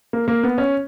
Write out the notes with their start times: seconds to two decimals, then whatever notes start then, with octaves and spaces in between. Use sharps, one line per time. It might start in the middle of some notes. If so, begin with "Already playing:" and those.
0.13 A#3
0.28 A#3
0.43 B3
0.58 C#4